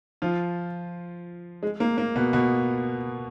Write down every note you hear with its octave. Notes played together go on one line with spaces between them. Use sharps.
F3 F4
G#3
A#3
A#3
B2 B3
B2 B3